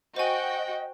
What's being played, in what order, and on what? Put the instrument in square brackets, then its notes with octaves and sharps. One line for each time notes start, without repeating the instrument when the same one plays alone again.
[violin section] F#4 G5 [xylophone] C5 G#5 [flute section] D#5